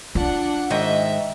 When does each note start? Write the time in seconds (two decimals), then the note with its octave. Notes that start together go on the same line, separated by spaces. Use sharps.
0.15 D4 F4 F#5
0.70 G#2 D#3 D#5 E5